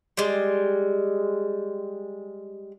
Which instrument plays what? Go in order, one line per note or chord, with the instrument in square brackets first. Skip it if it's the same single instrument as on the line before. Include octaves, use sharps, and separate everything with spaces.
[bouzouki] G3 G#3